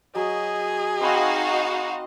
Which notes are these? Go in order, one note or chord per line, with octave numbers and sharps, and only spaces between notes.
F#3 G#4 D#5
C4 D#4 F#4 F5 B5 E6